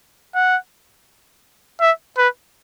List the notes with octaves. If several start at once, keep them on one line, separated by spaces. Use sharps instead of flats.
F#5
E5
B4